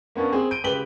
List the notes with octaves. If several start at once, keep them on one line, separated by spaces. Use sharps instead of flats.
A#3 B3 C#4 D4
C4 G#4
G6 D7 D#7
C#2 G4 B4 B6 F#7 G7